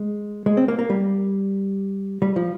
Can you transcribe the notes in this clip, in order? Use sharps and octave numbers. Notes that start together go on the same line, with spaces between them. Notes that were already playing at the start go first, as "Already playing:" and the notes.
Already playing: G#3
G#3
C4
A#3
A#3
G3
G3
F3